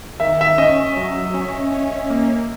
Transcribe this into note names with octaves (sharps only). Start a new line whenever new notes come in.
D#3 E5
E5
C#4 D#5
F#3
C#4
C#4
A#3